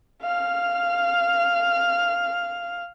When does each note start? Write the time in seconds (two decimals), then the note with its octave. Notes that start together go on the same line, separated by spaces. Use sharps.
0.22 F5 F6